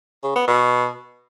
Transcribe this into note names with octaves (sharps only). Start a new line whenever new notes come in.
C#3
B3
B2